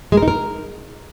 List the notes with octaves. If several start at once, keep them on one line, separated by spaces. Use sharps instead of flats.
G#3
A#4
D#4
A#4